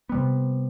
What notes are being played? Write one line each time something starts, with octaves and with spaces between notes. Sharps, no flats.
C3 G3 B3